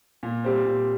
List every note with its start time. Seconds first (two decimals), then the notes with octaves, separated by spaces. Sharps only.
0.23 A#2
0.44 G3 C4
0.65 A#2